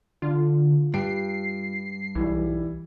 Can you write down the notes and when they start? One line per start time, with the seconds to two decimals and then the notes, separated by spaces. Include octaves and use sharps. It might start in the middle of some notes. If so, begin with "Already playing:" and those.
0.22 D3 F4
0.94 G2 C7 D7
2.15 B1 E3 G3